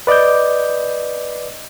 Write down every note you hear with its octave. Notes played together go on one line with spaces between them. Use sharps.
B4 D5 D#5 D6 G6